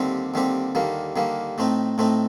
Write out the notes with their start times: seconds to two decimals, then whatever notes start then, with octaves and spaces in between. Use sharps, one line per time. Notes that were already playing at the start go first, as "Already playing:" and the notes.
Already playing: D#2 D3 G3 C4 G4
0.34 D#2 D3 G3 C4 G4
0.75 D#2 D3 G3 A#3
1.16 D#2 D3 G3 A#3
1.58 A2 A3 C4 D#4
1.98 A2 A3 C4 D#4